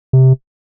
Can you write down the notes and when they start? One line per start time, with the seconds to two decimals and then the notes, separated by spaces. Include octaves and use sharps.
0.13 C3